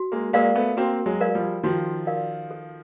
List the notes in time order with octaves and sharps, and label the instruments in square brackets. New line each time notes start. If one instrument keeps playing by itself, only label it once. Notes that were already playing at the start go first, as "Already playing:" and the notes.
Already playing: [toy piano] F#4
[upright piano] G#3 A#3
[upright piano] G#3 A#3 [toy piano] A#4 D5 F5
[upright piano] A3 B3
[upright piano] A#3 C4 [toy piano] F#4
[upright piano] F#3 G#3
[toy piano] A#4 D5 F5
[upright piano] F3 G3
[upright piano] D#3 F3 [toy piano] F#4
[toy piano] A#4 D5 F5
A4